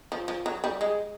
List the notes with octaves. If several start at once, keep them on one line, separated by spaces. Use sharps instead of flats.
F3
F3
F#3
G3
G#3